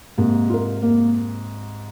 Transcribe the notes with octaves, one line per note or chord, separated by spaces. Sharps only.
G#2 C3 A#3
F4 A#4
A#3